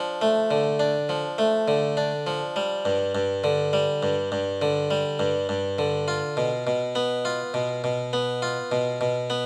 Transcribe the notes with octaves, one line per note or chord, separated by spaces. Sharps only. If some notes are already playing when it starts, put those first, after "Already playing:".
Already playing: F3 D4
A3
D3
D4
F3
A3
D3
D4
F3
G3
G2
G2
D3
G3
G2
G2
D3
G3
G2
G2
D3
F4
B2
B2
B3
F4
B2
B2
B3
F4
B2
B2
B3